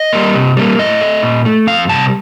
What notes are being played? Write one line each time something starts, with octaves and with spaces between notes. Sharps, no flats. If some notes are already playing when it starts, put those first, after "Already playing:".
Already playing: D#5
G3 A#3
C3
G3 A#3
A2 D#5
A3
A#2
A3
F2 F5
C3 G3 A5